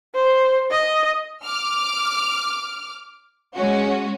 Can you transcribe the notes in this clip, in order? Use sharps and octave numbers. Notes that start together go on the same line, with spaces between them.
C5
D#5
D6 F6
G#3 C#4 F#4